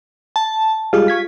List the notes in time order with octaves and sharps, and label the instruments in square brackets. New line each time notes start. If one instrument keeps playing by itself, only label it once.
[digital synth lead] A5
[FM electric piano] G3 G#3 G#4 [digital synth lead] F4
[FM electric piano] C#6 G#6 B6